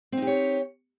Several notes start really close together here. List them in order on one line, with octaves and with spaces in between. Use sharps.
C4 D#4 G4 C#5